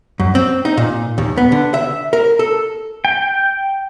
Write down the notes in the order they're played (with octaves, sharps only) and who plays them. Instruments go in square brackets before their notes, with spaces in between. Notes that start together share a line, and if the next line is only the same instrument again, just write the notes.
[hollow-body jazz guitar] F#2
C4
D#4
A#2
D#2
B3
D3
E5
A#4
A4
[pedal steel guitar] G5